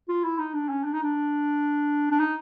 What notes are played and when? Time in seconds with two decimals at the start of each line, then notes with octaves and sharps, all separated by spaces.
0.09 F4
0.24 E4
0.39 D#4
0.54 D4
0.69 C#4
0.84 D4
0.93 D#4
1.03 D4
2.11 D4
2.19 D#4